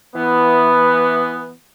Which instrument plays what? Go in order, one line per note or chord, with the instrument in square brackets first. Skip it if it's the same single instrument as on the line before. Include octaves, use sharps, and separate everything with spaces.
[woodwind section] E3 B3 [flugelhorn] B4